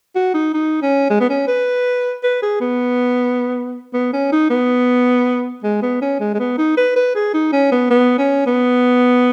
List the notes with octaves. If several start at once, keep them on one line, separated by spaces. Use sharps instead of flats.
F#4
D#4
D#4
C#4
G#3
B3
C#4
B4
B4
G#4
B3
B3
C#4
D#4
B3
G#3
B3
C#4
G#3
G#3
B3
D#4
B4
B4
G#4
D#4
C#4
B3
B3
C#4
B3